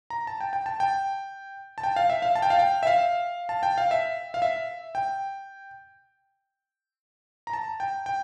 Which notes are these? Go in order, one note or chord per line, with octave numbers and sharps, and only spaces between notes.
A#5
A5
G5
G5
A5
G5
A5
G5
F5
E5
F5
A5
G5
F5
G5
E5
F5
A5
G5
F5
E5
F5
E5
G5
A#5
A5
G5
G5